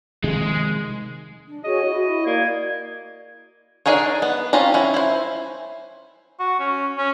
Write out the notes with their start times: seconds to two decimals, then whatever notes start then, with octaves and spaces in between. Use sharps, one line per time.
0.24 C3 D#3 F3 G#3
1.46 D4
1.64 F#4 G#4 C#5 D#5
1.85 E4 F#4
2.26 A#3 D5 G#6
3.86 D4 D#4 G#4 A#4 C#5
4.22 B3
4.53 C4 C#4 F4 G4 A#5
4.74 C#4 E4
4.94 E4 C5
6.39 F#4
6.60 C#4
6.98 C#4